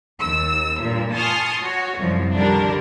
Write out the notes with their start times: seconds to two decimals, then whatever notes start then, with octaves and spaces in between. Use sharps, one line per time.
0.20 D#2 E6
0.82 G2 A#2
1.14 G#5 A5 C6 C#6 D#6 F6
1.62 F#4 C#5
1.98 C2 F#2 F3
2.35 D3 D#3 G3 D4 A#4